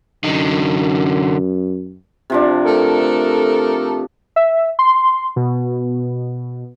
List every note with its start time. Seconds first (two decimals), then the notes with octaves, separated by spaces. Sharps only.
0.24 F#2 D3 D#4
2.30 C3 F3 D4
2.65 A3 A4 A#4
4.36 E5
4.79 C6
5.36 B2